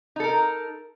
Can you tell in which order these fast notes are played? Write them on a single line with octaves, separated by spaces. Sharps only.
D#4 A4 A#4